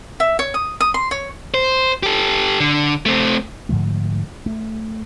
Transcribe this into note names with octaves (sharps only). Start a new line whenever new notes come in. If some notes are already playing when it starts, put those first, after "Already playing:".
E5
C#5
D#6
D#6
C6
C#5
C5
G4 A4
D3
A3 C4
G#2 D3 F3 A3
A3